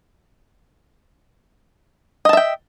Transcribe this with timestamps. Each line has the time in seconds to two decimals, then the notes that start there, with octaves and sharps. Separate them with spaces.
2.25 D#5
2.29 A5
2.33 E5
2.37 G5